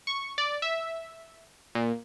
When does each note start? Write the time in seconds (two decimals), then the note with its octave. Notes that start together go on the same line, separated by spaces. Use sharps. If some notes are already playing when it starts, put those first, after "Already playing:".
0.07 C#6
0.38 D5
0.62 E5
1.75 A#2